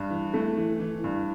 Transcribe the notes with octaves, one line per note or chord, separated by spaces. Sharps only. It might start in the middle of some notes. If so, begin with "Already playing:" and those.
Already playing: G2
E3
A3
E3
E3
G2